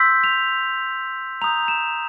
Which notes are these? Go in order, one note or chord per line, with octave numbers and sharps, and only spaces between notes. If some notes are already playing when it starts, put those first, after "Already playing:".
Already playing: C6 E6 G6 B6
F7
A#5 D#6 G6 F7
E7